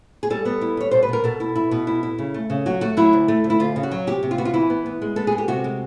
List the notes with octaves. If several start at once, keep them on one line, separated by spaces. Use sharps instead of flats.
G#4
G3 A4
B3
E4
G3 C#5
B2 C5
B4
B2 A#4
B2 A4
E4
E4
B2
E4
E4
C#3
A3
C#3
F#3 F#4
A3 F#4
F#3 E4
D2
A3
D2
E4
D2 F4
C#3
F#4
F#3
C3 G4
C3
F4
B3 F#4
F4
E3 E4
B3
B3
G#3
B3 A4
G#4
G#3
G4
C3 F#4
G#3